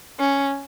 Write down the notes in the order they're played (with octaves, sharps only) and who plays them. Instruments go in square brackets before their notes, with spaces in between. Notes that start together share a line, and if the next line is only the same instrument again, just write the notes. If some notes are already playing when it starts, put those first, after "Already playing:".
[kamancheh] C#4